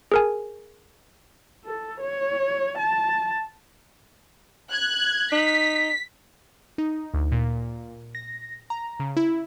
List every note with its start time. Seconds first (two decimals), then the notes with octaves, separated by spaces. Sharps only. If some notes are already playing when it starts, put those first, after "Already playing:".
0.12 G#4 A#4 G#5
1.65 A4
2.00 C#5
2.78 A5
4.72 F#6 G#6
5.32 D#4 B6
6.78 D#4
7.14 D2
7.32 A#2
8.15 A#6
8.70 A#5
9.00 C#3
9.17 E4